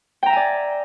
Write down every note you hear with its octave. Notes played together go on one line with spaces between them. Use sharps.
D5 E5 G5 G#5 A#5